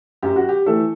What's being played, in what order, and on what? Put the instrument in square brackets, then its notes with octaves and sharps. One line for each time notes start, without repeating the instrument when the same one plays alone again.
[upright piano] F#2 G4
F#4
G4
E3 A3 A4